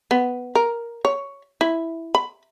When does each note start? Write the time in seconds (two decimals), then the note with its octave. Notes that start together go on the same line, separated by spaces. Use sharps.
0.11 B3
0.55 A#4
1.05 C#5
1.61 E4
2.15 B5